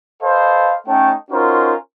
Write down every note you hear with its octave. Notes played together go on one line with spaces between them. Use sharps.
A4 B4 C5 D#5 F5
A3 C#4 D#4 C#5 G5 A5
C#4 D#4 F4 F#4 A#4 C5